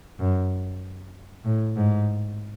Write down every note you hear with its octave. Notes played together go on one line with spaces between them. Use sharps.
F#2
A2
G#2